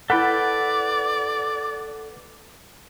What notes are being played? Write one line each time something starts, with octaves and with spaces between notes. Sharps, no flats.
E4 A4 B4 D5 F#5 G5 B5 B6